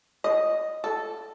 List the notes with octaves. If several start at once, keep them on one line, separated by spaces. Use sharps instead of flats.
D#5
A4